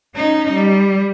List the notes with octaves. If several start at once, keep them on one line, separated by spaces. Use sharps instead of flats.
C#4 D#4
G3